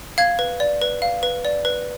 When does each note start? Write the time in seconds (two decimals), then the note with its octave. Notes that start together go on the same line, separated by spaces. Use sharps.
0.18 F5 G#6
0.39 B4
0.60 D5
0.82 B4
1.02 F5
1.23 B4
1.45 D5
1.65 B4